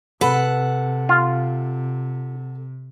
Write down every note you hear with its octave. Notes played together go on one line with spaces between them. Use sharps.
C3 A4 B4 F#5
F4